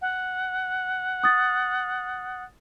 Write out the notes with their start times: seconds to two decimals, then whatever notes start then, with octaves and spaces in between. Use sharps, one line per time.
0.02 F#5
1.24 D#6 A6